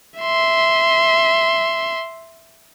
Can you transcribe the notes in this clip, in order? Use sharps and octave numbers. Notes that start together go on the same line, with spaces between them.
E5 C6